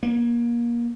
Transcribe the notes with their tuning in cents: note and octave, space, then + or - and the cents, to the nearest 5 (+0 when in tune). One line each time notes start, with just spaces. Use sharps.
A#3 +25